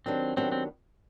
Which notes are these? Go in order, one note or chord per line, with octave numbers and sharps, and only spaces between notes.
D#3 F#3 B3 C4 D4 G4
D#3 F#3 B3 C4 D4 G4
C4